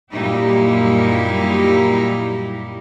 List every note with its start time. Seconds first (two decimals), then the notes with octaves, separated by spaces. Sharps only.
0.11 F#2 A#2 G3 D#4 E4 G4